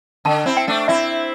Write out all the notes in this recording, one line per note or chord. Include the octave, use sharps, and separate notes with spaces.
D3 A5
C4 E4
G5
A3 D4
C4 E4 E5